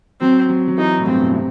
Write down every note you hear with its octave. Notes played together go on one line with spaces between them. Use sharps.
F#3 C4
F#3
F#3
E3 D#4
A2
G2 C4
B2
C3